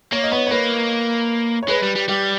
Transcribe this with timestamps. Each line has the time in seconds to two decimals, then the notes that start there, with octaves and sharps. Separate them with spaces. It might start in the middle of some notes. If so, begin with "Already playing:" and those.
0.12 A#3 C#5
0.23 D#5
0.32 B3 C#5
0.47 C#5
0.51 A#3 B4
1.63 C#5
1.69 G#3 B4
1.83 G3
1.96 G3
2.08 G3 G4